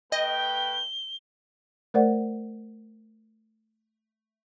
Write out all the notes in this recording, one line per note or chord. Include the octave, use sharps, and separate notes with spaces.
A3 B4 D#5 G5 G7
A3 A#4 C5 D5 F#5